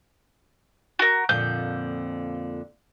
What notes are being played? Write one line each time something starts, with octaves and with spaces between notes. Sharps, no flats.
F#4 A#4
F2 A#2 D3 G6